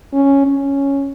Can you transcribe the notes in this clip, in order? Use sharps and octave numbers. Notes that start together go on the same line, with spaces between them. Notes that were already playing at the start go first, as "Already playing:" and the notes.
C#4
C#4